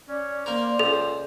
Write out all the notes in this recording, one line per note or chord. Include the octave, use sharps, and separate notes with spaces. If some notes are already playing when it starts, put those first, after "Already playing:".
C#4 D5
A#3 A#4 C5
C#2 A4